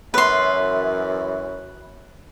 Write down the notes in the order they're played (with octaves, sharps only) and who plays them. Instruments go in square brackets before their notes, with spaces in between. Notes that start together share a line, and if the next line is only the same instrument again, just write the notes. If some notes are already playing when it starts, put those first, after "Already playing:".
[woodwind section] F#2 E3 [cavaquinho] B4 C6